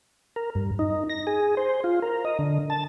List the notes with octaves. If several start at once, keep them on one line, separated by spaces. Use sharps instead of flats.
A#4
G2
D#4
A#6
G#4
C5
F4
A#4
D#5
D3
A5